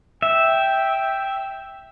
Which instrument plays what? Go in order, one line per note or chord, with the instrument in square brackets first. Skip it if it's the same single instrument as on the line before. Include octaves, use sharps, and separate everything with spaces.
[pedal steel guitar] E5 [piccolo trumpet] G5